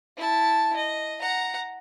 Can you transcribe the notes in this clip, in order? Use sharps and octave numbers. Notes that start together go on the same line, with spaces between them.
E4 A5
D#5
F#5 A#5